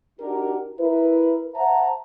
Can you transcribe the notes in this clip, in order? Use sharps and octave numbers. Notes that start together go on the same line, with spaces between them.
D4 D#4 F#4 G4 A#4
E4 A#4 B4
C5 E5 F#5 A5 A#5